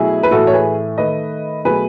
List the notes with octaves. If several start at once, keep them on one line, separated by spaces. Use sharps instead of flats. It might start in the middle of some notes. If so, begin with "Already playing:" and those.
Already playing: B2 F#3 A3 E4 G#4
B4
A2 E3 A3 F#4 A4
C#5
G#4 B4
D#3 A3 B4 D#5
B2 F#3 A3 G#4 B4